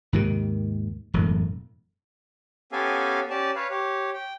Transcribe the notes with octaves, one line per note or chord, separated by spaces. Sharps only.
D#2 G#2 C3 D#3
E1 F#2 A2
B3 C#4 G4 A4 F5 G#5
C#4 G4 D5 A5
B4 C#5 F5
G4 C#5
G5